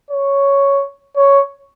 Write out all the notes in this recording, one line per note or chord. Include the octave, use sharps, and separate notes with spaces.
C#5
C#5